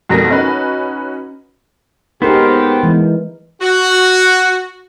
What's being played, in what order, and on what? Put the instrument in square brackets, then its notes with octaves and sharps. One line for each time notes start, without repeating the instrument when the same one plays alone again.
[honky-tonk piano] F2 G#2 B2 G3 A#4 A#6
C#4 D#4 F#4 B4
[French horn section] G#2 G4 [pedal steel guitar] B3 C5 [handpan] D#4 A#4
[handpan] E3 G#3
[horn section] F#4